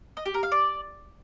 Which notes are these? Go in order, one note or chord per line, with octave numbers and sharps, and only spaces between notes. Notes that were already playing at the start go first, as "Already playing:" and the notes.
D#5
G4
A#4
F5
D5